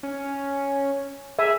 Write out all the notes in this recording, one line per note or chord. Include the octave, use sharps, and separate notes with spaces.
C#4
G#4 E5